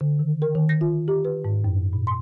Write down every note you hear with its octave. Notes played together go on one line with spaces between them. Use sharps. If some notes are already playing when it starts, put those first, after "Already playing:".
D3
D#3
A#4
D#3
A#6
F4
G4
B4
G#2
F#2
A#2
C6